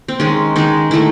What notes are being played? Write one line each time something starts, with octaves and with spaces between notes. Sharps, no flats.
C4
D#3 G#3 C#4
D#3 G#3 D#4
D#3 A3 E4